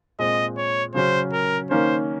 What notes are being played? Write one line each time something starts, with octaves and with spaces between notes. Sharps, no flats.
A#2 G#3 C4 D#5
C#5
C#3 F#3 C#4 C5
A#4
D#3 A#3 C#4 C5